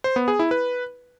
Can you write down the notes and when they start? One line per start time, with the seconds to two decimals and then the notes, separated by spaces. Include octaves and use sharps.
0.04 C5
0.16 B3
0.28 G#4
0.39 E4
0.51 B4